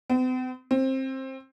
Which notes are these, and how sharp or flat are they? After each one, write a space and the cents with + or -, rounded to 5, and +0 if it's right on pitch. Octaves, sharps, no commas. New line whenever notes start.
C4 -45
C4 +20